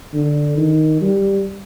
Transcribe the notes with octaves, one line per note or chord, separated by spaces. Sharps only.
D3
D#3
G3